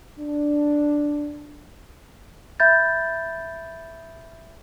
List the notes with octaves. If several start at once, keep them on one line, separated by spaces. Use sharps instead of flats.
D4
E5 B5 G6 A6